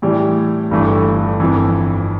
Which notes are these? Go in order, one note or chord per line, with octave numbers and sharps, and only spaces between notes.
A2 E3 G3
G1 G2 E3 A3
G1 F2 E3